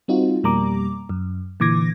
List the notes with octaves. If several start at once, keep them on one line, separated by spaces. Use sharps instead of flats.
G3 C4 D#4 F4 F#4
F2 B2 G3 A#3 A#5 D6
F#2
A#2 D3 E3 D6 G#6 A#6